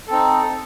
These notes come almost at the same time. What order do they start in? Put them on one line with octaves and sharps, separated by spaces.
A4 C4 D#4